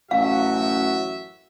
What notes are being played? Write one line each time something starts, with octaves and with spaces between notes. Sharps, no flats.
A1 F#2 F#4 E5 F5